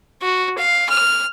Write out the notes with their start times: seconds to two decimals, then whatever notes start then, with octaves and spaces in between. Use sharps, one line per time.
0.22 F#4
0.58 F5
0.90 F6